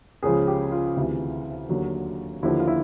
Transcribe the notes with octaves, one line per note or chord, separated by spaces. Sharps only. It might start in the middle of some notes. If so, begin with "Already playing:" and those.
C#2 C#3 F3 G#4
G4
F4
D2 C3 E3
D#2 D3 F#3
D#2 D3 F3 E4
F4
E4